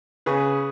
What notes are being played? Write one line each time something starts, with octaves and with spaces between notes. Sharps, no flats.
C#3 G#4 B4